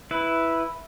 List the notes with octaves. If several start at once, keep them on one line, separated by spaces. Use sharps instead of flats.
E4 B4